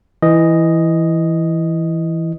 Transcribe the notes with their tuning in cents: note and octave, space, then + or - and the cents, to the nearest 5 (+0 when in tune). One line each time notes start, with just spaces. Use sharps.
E3 +0 D#5 +0